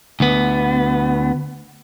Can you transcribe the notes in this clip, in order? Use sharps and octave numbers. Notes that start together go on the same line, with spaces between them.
D2 B3